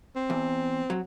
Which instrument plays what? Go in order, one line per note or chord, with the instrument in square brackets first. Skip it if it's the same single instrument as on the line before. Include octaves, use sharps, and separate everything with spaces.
[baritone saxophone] C4
[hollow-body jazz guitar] E2
F#3